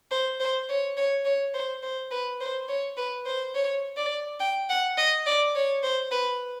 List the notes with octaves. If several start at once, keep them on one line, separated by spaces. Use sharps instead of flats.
C5
C5
C#5
C#5
C#5
C5
C5
B4
C5
C#5
B4
C5
C#5
D5
G5
F#5
D#5
D5
C#5
C5
B4